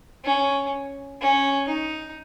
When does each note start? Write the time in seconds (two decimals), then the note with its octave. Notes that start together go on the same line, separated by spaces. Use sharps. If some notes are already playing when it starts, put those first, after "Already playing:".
0.25 C#4
1.21 C#4
1.69 D#4